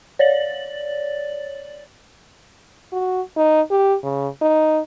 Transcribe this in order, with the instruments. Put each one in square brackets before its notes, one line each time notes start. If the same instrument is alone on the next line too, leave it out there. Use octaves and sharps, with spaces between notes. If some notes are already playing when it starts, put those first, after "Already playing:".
[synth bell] C#5 D5 A6 F#7
[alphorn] F#4
D#4
G4
C#3
D#4